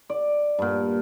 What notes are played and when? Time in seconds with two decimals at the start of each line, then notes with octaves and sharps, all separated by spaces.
0.10 D5
0.59 G2 A#2